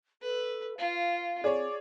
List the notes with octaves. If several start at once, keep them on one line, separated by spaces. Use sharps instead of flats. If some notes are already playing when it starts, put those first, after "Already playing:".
A4 B4
F4 F5
C4 G#4 C#5 D5